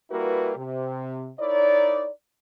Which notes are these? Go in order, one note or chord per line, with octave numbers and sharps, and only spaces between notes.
G3 A#3 E4 F#4 A#4 B4
C3
D#4 E4 A#4 C#5 D5